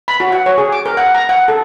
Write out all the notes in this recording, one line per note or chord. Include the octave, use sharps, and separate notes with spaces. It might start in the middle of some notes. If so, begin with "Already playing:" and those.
B5
F#4
F#5
C#5
G#4
D6
A#4
F#5
A#5
F#5
A4